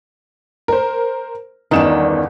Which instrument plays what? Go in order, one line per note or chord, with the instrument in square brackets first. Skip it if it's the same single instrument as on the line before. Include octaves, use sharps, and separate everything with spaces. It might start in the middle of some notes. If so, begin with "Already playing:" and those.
[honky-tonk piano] A#4 C5
[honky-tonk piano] G1 E2 E7 [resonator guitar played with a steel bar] D#3 C#4 D5